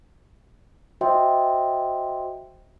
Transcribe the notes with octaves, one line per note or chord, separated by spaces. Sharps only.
F#4 C5 D#5 E5 G5 C6